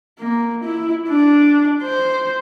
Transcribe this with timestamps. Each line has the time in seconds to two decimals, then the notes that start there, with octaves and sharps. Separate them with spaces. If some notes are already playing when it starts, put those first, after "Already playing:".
0.19 A#3
0.64 E4
1.09 D4
1.83 C5